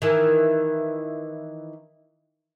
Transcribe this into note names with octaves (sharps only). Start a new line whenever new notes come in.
D#3 E3